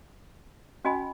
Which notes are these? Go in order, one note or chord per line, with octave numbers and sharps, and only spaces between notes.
C#4 F#4 D#5 G#5 B5